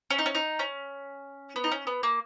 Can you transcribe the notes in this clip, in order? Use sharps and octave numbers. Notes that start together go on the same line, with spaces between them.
C#4
D#4
C#4
D#4
C#4
B3
D#4
C#4
B3
A#3